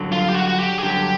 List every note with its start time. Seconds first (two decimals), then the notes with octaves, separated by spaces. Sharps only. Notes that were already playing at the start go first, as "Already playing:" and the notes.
Already playing: G2 D3 F#3
0.12 F4
0.29 G4
0.35 F#4
0.48 F#4
0.60 G4
0.79 G#4
0.83 G2 D3 F#3 G4